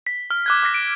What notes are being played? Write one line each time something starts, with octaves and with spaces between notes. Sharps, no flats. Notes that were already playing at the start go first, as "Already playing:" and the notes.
B6
F6
D6 F#6 G#6
D6 F6 A#6 B6
D7